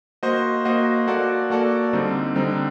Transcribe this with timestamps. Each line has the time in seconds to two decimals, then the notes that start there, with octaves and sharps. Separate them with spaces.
0.23 A#3 F#4 C5 D#5
0.65 A#3 F#4 C5 D#5
1.08 A#3 F#4 A4 D5
1.50 A#3 F#4 A4 D5
1.93 D3 G3 C4 D#4
2.36 D3 G3 C4 D#4